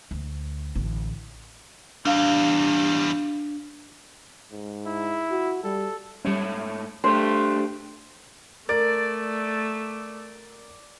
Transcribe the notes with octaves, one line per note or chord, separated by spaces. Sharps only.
D2
A1 D3
E2 G3 D4 F5
G#2
E4
F#4
G3 A4
G#2 G3 A3 C#4 C#5
A3 D4 G4 C5
A3 A#4 D5